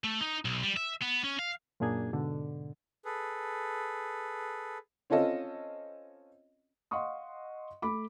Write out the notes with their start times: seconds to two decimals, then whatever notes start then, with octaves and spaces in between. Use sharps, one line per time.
0.04 A3
0.21 D#4
0.45 B1
0.63 G3
0.77 E5
1.02 B3
1.24 C#4
1.39 F5
1.80 F#2 A#2 A#3 D4 G#4 G#6
2.13 G#2 B2 D3
3.05 G#4 A4 B4
5.10 C4 C#4 F4 A4 D#5
6.91 D#5 F5 F#5 C6 C#6 D#6
7.82 A3 B5 D6